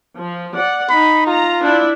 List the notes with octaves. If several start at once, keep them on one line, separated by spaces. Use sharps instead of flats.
F3
D5 F#5
D#4 B5
F4 A#5
D4 E4